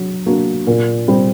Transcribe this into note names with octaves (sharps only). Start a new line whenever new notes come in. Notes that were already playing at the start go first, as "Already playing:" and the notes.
Already playing: F#3 D4
A#3 D4 F#4 A#4
A#2
G3 C4